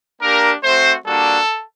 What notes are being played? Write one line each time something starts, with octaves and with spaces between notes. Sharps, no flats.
A#3 D4 G4 A#4
A3 C4 F#4 C5
G3 A#3 D4 F#4 A4